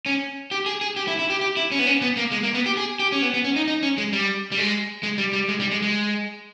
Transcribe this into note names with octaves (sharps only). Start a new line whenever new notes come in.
C#4
G4
G#4
G#4
G4
E4
E4
G4
G4
E4
C#4
B3
C#4
B3
A#3
G#3
A#3
B3
G4
G#4
G4
C#4
B3
B3
C#4
D#4
D#4
C#4
G#3
G3
G3
G#3
G#3
G3
G3
G#3
G3
G#3
G#3